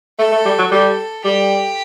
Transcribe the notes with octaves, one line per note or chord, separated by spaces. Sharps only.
A3 A4
A3
G3
F#3
G3 A4
G3 G4